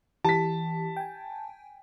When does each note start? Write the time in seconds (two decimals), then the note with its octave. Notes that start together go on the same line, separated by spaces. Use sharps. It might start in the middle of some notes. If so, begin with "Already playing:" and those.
0.25 E3 G4 A5 B6
0.96 G5 G#5